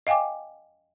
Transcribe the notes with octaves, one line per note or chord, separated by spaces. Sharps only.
D#5 F5 G5 G#5 D6